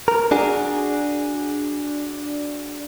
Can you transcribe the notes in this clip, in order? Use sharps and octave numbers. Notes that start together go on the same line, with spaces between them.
A#4
D4 F#4 G#4